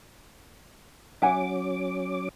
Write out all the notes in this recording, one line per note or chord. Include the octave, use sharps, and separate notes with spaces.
F#3 C#4 E5 F#5 G#5 D6